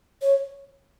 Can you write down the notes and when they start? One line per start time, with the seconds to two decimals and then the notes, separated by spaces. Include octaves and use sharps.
0.22 C#5